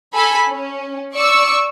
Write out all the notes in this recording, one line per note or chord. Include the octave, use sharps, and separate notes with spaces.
A4 G#5 B5
C#4
D5 C#6 E6